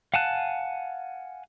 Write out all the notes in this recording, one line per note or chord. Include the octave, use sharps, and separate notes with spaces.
F5 F#5 G#5 A5 F#6